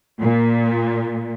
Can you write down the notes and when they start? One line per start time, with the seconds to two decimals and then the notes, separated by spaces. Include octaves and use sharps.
0.21 A#2